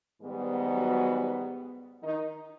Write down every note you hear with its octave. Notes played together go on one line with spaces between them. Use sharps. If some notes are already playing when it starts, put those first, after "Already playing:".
G#2 D#3 G3 B3
F#3 F#4
D#3 D#4